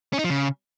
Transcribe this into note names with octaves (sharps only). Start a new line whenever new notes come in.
C#4
D#4
F3
C#3